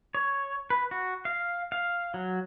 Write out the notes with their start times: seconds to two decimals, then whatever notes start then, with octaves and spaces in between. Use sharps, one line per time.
0.15 C#5
0.70 B4
0.91 F#4
1.25 F5
1.72 F5
2.14 F#3